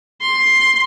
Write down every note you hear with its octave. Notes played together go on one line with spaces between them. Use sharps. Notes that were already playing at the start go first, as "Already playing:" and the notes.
C6